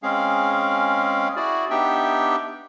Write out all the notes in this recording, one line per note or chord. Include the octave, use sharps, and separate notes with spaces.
G#3 C4 C#4 G#4 F5
E4 F#4 G#4 D5
B3 D4 D#4 G4 E5 G5